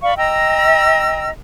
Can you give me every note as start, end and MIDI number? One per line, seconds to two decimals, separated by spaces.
0.02 0.14 74
0.02 0.14 77
0.02 0.14 83
0.02 0.14 85
0.17 1.29 75
0.17 1.29 79
0.17 1.29 82
0.17 1.29 88